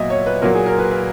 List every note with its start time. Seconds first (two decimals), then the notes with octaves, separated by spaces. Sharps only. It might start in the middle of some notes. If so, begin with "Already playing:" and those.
Already playing: A#2 F#3 B3 D#5 E5
0.10 C#5
0.27 B4
0.42 A#2 F#3 A#3 A#4
0.55 G#4
0.66 A#4
0.79 B4
0.91 B4